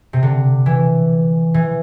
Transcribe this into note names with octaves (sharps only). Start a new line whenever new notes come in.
C3
D3
E3
E3